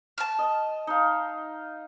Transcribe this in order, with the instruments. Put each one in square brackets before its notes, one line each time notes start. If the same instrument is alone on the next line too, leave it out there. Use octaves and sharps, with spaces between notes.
[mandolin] A5 F6
[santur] D#5
D#4 F5